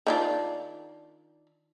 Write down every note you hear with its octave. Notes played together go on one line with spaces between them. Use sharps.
D#3 D4 F4